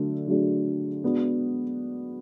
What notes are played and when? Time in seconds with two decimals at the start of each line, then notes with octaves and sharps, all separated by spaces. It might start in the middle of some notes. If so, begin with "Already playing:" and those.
Already playing: D3 F#3 A3 D4
0.28 D3 F#3 A3 D4 G#4
1.03 G#3 B3 D4 F#4